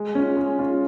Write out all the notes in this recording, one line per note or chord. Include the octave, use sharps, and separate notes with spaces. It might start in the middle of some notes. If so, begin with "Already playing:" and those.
Already playing: G#3
C#4 F4
G#3
C#4 F4